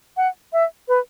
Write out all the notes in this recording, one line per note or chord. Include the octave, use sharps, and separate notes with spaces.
F#5
E5
B4